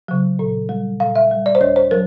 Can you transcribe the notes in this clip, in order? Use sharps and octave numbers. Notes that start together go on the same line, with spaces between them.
C#3 F#3
A#2
G3
A#2 F5
E5
G3
D5
C5
D#2 C#5
C5
F#3 A#4